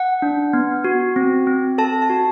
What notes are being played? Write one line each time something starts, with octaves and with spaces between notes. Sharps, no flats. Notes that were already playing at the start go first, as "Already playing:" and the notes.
Already playing: F#5
D4
B3
F#4
C4
C4
A4 A5
A5
F#4